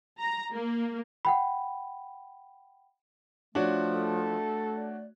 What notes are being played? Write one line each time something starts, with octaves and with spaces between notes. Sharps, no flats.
A#5
A#3
F#5 G5 B5
F3 A3 D4 F#4 C#5
A4
D5